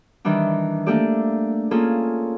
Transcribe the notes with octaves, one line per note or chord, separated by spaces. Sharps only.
D#3 E3 G3 D4
A3 A#3 D4 G4 A4 D5
A#3 C#4 F4 G#4 A4